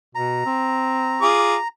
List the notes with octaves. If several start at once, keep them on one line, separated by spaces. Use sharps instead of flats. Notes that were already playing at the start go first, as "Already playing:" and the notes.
B2 A#5
C4
F4 G#4 D6